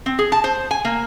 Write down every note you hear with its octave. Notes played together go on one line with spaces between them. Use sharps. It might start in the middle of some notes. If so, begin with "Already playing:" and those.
C4
G#4
A5
C5
G#5
A#3